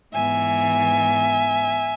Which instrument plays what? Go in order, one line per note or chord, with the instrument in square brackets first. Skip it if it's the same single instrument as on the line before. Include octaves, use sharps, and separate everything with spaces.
[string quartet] G#2 E3 B3 E5 G#5